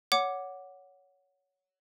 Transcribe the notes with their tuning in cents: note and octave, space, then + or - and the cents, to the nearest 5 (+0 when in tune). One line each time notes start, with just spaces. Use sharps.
C#5 +15 F#5 +0 D6 +0